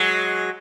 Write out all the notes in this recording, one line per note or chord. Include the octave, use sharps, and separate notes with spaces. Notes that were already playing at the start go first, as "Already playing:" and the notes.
Already playing: F#3 G#3